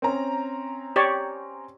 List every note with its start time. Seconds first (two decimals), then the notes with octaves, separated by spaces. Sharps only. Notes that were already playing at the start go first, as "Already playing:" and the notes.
0.02 C4 C#4 A#5
0.96 G4 C#5 D5